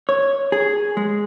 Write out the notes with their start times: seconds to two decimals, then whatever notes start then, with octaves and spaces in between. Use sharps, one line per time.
0.09 C#5
0.52 G#4
0.97 G#3